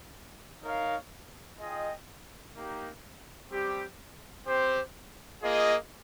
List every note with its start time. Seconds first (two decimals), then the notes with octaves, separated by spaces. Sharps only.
0.62 D#4 A#4 C#5 F5
1.58 F4 G#4 D#5 G5
2.54 A#3 D#4 G4
3.51 G3 C4 G4
4.47 C4 G4 C5
5.43 A#3 F4 G#4 D#5